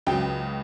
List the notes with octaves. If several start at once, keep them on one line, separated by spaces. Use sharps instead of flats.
C#2 C#3 F#3 G5